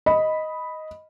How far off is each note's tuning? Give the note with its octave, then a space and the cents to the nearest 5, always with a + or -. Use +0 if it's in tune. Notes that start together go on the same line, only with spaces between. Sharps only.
D#5 +5 B5 +0